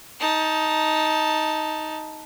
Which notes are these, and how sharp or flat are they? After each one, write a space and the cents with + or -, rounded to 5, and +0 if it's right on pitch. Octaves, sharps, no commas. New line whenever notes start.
D#4 +10 A5 +0